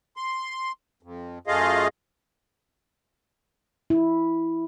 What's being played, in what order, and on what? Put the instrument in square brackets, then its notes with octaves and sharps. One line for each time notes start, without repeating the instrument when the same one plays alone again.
[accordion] C6
F2
F#2 A3 F4 G#4 D#5 F5
[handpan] E4